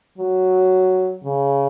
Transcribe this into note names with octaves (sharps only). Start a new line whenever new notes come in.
F#3
C#3